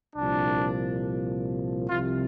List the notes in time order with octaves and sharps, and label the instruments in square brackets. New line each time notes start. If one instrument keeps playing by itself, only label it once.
[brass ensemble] C2 A#2 F3 D4
C2 C3 F3 F4